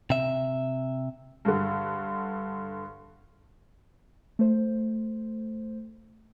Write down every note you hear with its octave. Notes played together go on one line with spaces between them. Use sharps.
C3 E5
G2 D3
A3 C5